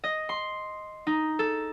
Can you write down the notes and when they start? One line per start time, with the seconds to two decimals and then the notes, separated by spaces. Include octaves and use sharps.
0.04 D#5
0.29 C6
1.07 D#4
1.39 A4